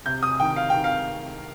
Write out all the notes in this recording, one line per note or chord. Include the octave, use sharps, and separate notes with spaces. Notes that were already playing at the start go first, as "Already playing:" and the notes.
C3 G6
D#6
D#3 G5
F5
D#3 G5
F5